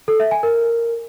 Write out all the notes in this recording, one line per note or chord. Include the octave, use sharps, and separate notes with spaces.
A4
E5
G#5
A#4